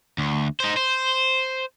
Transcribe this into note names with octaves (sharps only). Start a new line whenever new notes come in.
D2
D#4 C5
C5